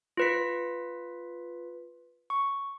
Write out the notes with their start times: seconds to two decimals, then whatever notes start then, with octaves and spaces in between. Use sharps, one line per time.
0.17 F4 B4 B6
2.30 C#6